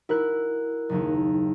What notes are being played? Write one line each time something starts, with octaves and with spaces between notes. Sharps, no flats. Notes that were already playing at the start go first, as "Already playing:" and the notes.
E4 F#4 A#4 F#6
F#1 D#2